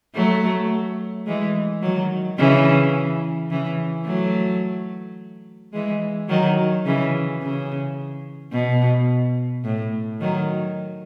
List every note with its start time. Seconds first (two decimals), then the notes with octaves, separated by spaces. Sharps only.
0.15 F#3 A3
1.27 E3 G#3
1.82 D#3 F#3
2.38 C#3 E3
3.51 C#3 E3
4.06 F#3 A3
5.73 E3 G#3
6.29 D#3 F#3
6.86 C#3 E3
7.41 C#3
8.52 B2
9.65 A2
10.21 D#3 F#3